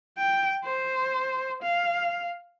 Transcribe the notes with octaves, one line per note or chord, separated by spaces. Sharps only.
G5
C5
F5